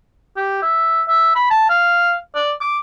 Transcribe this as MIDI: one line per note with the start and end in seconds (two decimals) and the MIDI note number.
0.37 0.58 67
0.62 1.02 76
1.08 1.31 76
1.35 1.49 83
1.51 1.66 81
1.70 2.16 77
2.35 2.52 74
2.61 2.78 86